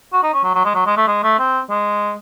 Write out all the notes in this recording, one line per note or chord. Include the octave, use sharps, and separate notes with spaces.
F#4
D#4
C#4
F#3
F#3
G#3
F#3
G#3
A3
G#3
A3
C4
G#3